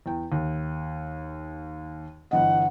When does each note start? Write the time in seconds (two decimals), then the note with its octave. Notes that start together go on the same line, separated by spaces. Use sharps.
0.06 E2 G5
0.32 D#2
2.31 G1 E3 D#5 F#5